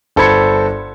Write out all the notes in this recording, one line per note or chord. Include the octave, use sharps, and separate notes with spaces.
G1 A4 C5 B5 G#6 C#7